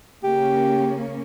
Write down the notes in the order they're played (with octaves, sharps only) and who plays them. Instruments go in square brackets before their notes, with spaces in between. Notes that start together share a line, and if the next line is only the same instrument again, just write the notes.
[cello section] C#3 A#3 C#4 [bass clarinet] G4